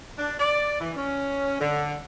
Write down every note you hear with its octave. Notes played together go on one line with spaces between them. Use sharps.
D4
D5
E3
C#4
D3